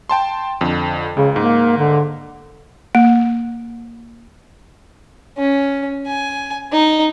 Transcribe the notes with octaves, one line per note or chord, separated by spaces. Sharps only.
G5 A5 C6
F2 D3
C#2 C#3
G#2 A#3
D3
A#3
C#4
G#5
D#4